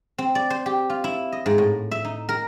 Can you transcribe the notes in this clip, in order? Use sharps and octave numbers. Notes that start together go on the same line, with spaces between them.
C4
D5
C5
G4
F4
E4
D#5
G#2
A2
E5
D#4
A#4